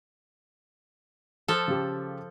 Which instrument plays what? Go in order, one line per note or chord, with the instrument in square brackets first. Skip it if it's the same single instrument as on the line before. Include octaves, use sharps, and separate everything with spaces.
[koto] F3 A4
[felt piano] C#3 G4